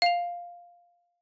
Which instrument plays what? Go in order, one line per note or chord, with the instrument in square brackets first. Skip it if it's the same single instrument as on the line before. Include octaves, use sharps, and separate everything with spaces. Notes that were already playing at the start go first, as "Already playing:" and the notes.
[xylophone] F5 F7